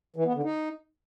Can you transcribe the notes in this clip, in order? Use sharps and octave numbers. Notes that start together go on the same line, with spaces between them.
E3
B3
D3
D#4